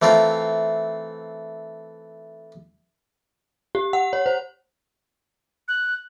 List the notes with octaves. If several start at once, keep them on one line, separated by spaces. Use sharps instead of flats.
E3 A3 C4 F4 A#4
G4
F#5
C#5
C5
F#6